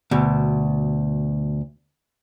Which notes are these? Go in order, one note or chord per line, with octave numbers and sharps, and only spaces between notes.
D2 B2